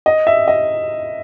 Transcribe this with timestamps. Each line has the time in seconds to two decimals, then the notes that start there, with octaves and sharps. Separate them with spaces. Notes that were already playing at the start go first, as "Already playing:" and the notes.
0.06 D#5
0.27 E5
0.48 D#5